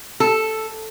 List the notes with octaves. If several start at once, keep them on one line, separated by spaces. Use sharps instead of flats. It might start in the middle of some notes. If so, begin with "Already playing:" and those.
A4